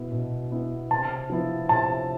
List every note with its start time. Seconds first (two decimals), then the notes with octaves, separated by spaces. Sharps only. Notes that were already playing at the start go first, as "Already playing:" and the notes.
Already playing: B2 B3 E4
0.12 B2
0.52 B3 E4
0.91 C3 A5
1.30 F3 B3 E4
1.69 C3 A5